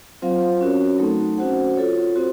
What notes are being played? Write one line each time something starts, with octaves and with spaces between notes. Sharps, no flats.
F#3 C4 F4 C5 F5
C#4 F#4 A#4 C#5
F#3 A3 C4 D#4 A4
C#4 F#4 C5 F#5
F4 A4 C#5
C4 F#4 C5